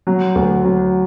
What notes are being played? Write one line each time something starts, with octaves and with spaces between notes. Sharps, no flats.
F#3
D2
F#3